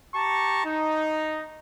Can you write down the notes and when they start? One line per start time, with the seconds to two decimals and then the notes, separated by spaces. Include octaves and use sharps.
0.15 G4 A5 A#5 C#6
0.64 D#4